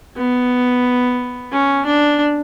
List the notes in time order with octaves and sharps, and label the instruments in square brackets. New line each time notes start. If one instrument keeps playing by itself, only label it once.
[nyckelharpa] B3
C#4
D4